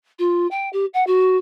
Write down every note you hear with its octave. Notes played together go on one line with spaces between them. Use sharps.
F4
G5
G4
F#5
F#4